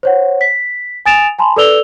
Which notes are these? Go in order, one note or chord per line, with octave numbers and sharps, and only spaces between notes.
C5 C#5 F#5
B6
G#5 D#6 A6 D7 E7 F7
G#5 A5 B5 C6
A4 B4 D5 E6 F7 G7